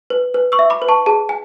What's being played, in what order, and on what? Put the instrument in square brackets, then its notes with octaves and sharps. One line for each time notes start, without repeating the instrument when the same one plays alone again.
[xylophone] B4
B4
C#6 E6
E5
B5 D6
B4
A5 C#6
G#4 A5
G#5